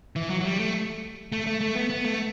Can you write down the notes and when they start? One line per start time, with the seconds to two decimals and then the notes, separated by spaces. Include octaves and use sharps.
0.16 E3
0.30 F#3
0.40 F#3
0.45 G3
0.59 A3
1.32 A3
1.46 A3
1.61 A3
1.75 B3
1.90 B3
2.04 A3